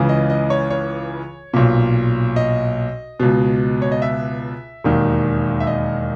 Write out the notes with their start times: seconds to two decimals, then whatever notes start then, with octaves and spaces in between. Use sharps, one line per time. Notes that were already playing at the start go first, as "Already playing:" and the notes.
Already playing: C#2 C#3 E3
0.09 D#5
0.30 D#5
0.50 C#5
0.70 C#5
1.53 B1 A#2
2.36 D#5
3.20 C#2 B2
3.82 C#5
3.92 D#5
4.02 E5
4.84 E1 D#2 D#3
5.60 E5
5.67 D#5